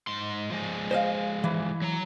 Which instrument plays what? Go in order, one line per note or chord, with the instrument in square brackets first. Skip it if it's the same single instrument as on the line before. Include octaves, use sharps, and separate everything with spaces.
[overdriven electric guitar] G#2 C6
F3 G#3
[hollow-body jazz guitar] C5 D#5 F5
E3
[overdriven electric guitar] F#3 A#5